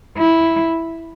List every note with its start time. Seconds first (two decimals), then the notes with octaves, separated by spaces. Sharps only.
0.17 E4